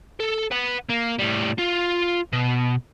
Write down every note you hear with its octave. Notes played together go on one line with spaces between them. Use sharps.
A4
B4 F#5
A#3
A2 G3
F4
B2